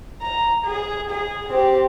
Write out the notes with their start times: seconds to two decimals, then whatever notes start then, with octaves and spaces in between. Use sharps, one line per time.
0.22 A#5
0.65 G#4
1.10 G#4
1.50 C4 G4